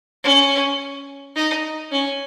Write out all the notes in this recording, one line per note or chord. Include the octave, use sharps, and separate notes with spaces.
C#4
D#4
C#4